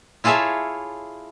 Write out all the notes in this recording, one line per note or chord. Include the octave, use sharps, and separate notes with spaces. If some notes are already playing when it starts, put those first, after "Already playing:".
E4 F4 G#4 A4 C#5 E5